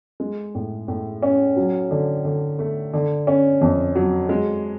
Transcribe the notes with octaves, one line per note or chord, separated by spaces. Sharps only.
G#3
A2
A2
C#4
F#3
D3
D3
A3
D3
C#4
F2
F#3
G#3